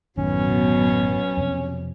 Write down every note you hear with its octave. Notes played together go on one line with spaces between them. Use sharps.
A1 F#2 B2 D#3 F#3 C#4
F2 C3